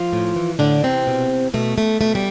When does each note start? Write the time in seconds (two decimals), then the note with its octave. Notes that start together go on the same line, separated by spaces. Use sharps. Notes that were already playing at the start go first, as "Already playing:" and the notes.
Already playing: F3 F4
0.13 A2
0.36 E3
0.59 A2 D3 D4
0.82 C3 E3 C4
1.07 B2
1.54 B2 A3
1.78 A3
2.01 B2 A3
2.15 G3